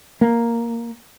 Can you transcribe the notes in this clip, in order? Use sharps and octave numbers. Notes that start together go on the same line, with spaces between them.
A#3